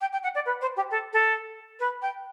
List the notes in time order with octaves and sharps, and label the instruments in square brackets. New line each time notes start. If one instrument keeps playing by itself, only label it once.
[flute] G5
G5
F#5
D5
B4
C5
G4
A4
A4
B4
G5